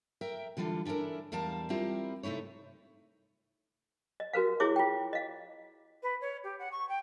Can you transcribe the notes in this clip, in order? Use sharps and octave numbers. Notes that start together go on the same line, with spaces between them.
A#4 E5 G5
D3 E3 G3 F4 A4
C#4 D4 E4 A4 A#4
E2 G3 A#4 F5 A5
G3 C4 E4 F4 G4 A#4
C3 A3 D#4 E4 C#5
D#5
F#4 A#4 B4 F5
E4 G#4 C#5 E5 D6
F4 G5
D#5 F5
B4
C#5
G4
F#5
C#6
G5